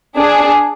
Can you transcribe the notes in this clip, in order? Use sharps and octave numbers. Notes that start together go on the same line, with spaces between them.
D4 G#4